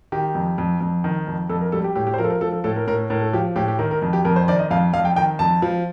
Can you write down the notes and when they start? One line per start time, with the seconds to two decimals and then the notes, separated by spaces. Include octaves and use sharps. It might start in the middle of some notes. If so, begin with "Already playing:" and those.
0.12 D#3 G4
0.35 F2
0.58 F2
0.81 F2
1.04 D#3
1.27 F2
1.49 F2 A4
1.61 A#4
1.72 G3 A4
1.84 G4
1.95 A2 G4
2.07 G4
2.14 C5
2.18 F3 A#4
2.24 A4
2.30 A#4
2.41 F3 A4
2.52 A4
2.64 A2 A4
2.76 A#4
2.87 A2 A#4
3.10 A2 A#4
3.22 A4
3.33 F3 G4
3.56 A2 G4
3.68 G4
3.79 D#3 A#4
3.91 A#4
4.02 F2
4.13 G4
4.25 F2 A#4
4.36 C5
4.48 D#3 D5
4.59 D#5
4.71 F2 F5
4.93 F2 F5
5.05 G5
5.16 D#3 G5
5.39 F2 A5
5.62 F3